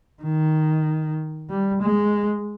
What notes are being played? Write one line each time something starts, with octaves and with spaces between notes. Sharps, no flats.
D#3
G3
G#3